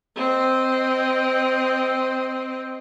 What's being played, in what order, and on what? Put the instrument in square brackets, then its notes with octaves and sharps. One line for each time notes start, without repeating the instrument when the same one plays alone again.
[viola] C4 D#5